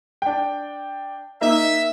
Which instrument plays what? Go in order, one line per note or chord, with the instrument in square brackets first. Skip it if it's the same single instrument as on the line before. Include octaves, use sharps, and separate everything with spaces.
[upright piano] D4 G5
[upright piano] A#3 D#4 [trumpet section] E5